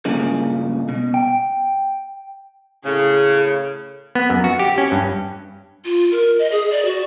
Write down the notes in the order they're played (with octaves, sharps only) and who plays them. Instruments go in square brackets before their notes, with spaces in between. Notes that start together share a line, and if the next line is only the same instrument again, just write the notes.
[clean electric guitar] G2 A#2 C#3 G#3
B2
G5
[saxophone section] A2 C#3 [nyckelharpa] G#4
[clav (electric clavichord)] B3
F#2
F#4
G4
C#4
G2
[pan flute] F4
A#4
D#5
G#4
D5
F#4